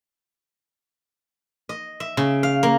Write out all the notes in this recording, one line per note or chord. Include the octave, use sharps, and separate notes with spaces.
D#5
E5
C#3
F5
A#3